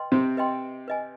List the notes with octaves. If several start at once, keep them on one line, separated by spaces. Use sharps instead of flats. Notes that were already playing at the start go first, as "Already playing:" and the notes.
Already playing: B4 D#5 G5 C6
C3 C4
B4 D#5 G5 C6
B4 D#5 G#5